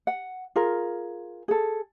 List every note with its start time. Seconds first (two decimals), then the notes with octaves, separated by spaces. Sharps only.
0.07 F#5
0.56 F4 G#4 A#4
1.48 G#4 A4